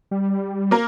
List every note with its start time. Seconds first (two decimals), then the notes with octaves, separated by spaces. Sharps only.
0.11 G3
0.71 A#3 A#4